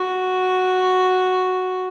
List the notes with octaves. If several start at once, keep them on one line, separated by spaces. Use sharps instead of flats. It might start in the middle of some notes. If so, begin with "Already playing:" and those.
Already playing: F#4